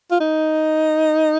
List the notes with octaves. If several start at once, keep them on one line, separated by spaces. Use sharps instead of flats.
F4
D#4